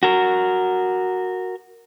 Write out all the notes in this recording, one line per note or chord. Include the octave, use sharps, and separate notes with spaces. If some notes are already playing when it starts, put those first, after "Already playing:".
F#4 A#4